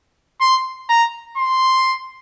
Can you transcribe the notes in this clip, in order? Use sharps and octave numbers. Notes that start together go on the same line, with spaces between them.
C6
A#5
C6